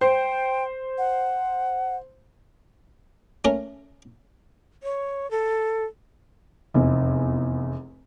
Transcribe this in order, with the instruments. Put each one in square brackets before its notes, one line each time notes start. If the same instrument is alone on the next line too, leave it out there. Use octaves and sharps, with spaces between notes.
[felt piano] C5 [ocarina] G5
[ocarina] F#5
[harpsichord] A3 C#4 A#4
[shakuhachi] C#5
A4
[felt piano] F1 E2